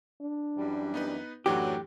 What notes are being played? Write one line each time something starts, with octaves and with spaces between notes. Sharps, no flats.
D4
F#2 E3 G3
B3 D#4 B4
F#2 A2 E3 F#3 D4 G4